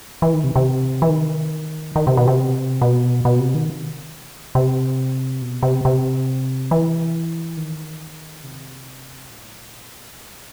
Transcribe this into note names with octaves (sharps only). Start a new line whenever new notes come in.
E3
D#3
C3
C3
E3
D#3
D#3
C3
B2
C3
B2
B2
C3
D#3
C3
B2
C3
C3
E3
D#3
C3
A2
B2